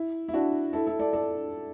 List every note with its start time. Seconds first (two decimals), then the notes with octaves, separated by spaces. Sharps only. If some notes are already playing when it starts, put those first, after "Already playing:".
Already playing: E4
0.28 E4
0.33 D4 F#4
0.73 E4 A4
0.86 E4 A4
0.99 A4 D5
1.13 A4 D5